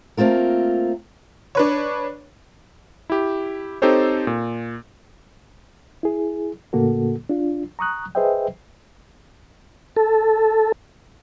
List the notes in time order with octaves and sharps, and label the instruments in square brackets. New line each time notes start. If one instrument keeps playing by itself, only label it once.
[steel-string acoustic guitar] A3 A#3 C4 F4 A#4
[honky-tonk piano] D4 B4 C#5
[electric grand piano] E4 G4
C4 D#4 G4 A4 C5 C#5
A#2
[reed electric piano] E4 G#4
A2 C#3 A#3 F#4 A4
D4 F4
A#5 C#6 D#6 F#6
G#4 B4 C5 D#5 E5 G5
[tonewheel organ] A4